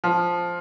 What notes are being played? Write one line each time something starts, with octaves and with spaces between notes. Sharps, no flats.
F3